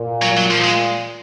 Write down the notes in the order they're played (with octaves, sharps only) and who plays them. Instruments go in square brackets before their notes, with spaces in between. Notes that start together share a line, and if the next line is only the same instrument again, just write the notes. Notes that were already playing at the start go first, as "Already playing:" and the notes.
Already playing: [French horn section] A#2
[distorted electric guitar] F#3
F#3
F3
G#3